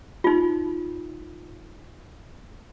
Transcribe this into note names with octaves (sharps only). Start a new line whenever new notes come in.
D#4 F4